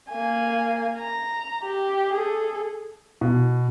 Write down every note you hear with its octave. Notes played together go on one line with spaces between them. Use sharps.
A#3 G#5
A#5
G4
G#4 A4
B2